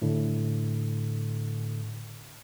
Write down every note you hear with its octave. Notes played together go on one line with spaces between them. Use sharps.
A2 D3